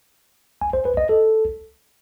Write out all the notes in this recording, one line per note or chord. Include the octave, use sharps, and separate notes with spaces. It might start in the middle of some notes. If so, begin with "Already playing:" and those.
G#5
C5
B4
D#5
A4